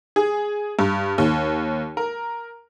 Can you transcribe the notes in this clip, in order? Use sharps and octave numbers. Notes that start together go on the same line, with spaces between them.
G#4
G2
D#2
A#4